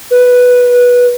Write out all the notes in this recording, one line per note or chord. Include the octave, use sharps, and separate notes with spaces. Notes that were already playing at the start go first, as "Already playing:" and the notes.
B4